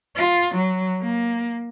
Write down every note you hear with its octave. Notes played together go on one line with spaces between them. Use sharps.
F4
F#3
A#3